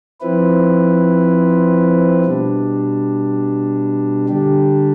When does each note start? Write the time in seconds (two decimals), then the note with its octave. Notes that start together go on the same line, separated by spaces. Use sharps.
0.20 F3 C4 E4 B4
2.25 B2 G3 D4
4.28 D3 G3 D4 G4